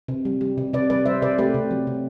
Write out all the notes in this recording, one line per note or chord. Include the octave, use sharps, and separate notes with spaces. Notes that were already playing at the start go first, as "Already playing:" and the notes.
C3
G3
G3
C3
C3 B4 D5
G3 B4 D5
G3 C5 E5
C3 B4 D5
A3 G4 B4
C3
F#3
C3